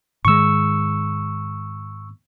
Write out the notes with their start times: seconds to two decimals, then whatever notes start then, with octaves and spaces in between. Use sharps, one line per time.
0.25 G#2 D#3 G#3 C#6 E6